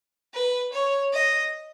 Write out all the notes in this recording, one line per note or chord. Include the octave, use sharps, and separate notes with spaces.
B4
C#5
D#5